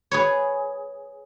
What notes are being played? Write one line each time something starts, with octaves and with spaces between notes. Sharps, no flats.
G#4 B4 C#5